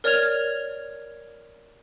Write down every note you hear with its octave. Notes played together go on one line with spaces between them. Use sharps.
A#4 C#5 D5 F6 G#6 F7